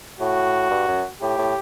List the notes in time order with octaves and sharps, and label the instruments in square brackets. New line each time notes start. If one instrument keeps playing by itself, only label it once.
[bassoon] A2 [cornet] F#4
[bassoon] G2
F#2
[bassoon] A2 [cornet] G4
[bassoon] A2